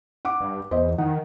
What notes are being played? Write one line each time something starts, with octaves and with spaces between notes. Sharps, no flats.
F#5 D6
G2
E2 C5 D#5
D#3 F#5